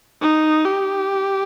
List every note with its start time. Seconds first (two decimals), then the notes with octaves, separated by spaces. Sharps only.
0.22 D#4
0.66 G4